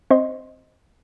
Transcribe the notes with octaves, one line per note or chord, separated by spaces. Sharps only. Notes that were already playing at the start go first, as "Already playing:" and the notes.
C4 C5 D#5 C6